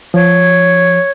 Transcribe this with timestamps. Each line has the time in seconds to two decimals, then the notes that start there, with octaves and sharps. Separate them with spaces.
0.14 F3 C#5